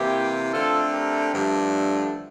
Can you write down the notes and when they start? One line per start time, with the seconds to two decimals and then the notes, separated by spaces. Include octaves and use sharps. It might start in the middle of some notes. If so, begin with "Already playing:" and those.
Already playing: C3 E3 A#3 E4 G4
0.51 D3 A3 C4 F4 A4
0.92 G4 A#4
1.32 G2 D3 F3 A3